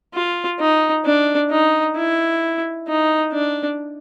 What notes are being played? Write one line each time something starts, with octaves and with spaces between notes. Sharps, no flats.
F4
D#4
D4
D#4
E4
D#4
D4